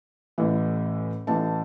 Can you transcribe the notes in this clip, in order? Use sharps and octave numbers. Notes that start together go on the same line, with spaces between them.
A1 A2 E3
A1 A2 E3 A5